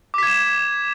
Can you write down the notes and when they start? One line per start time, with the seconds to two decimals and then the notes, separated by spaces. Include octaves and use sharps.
0.14 D6
0.18 B6
0.23 G#6
0.27 E7